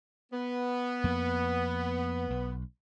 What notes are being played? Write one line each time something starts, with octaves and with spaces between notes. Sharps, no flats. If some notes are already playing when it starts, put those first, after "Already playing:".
B3
F2 A#3
B1